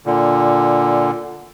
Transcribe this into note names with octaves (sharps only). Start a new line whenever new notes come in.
A#2 D3